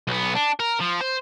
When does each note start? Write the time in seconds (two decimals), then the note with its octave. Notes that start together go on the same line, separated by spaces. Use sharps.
0.07 B1 B3
0.35 D4
0.60 A#4
0.80 F3
1.01 C5